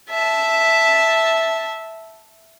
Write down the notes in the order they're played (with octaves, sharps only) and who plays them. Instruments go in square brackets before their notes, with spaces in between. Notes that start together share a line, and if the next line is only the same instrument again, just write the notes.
[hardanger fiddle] E5 A5